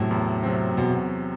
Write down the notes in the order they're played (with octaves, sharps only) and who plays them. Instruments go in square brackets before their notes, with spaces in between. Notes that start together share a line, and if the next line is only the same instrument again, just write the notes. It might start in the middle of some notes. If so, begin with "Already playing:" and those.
Already playing: [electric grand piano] E2 C3 F#3 C4 [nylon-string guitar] A2
[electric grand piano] E2
C3 F#3 C4
[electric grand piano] E2 [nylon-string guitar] B2